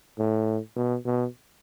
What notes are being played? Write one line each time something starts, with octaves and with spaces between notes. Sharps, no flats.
A2
B2
B2